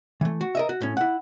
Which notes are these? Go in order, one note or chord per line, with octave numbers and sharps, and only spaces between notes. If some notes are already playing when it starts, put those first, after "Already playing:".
E3 A3
F#4
A#4 D#5 E5
F#4
A2 C#4
E4 F#5